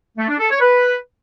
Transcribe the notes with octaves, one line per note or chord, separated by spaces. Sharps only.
A3
D4
A4
C#5
B4